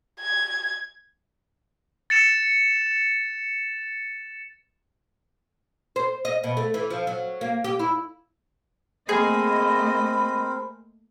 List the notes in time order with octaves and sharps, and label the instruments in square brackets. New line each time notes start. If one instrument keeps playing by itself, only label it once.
[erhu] G#6
[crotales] A6 C#7 E7
[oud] C5
D#5
B2
A3
E3
F3
F#3
A#3
G4
E4
[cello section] A3 A#3 D#5 [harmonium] C4 A#4 C5 [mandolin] G#4 [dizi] B5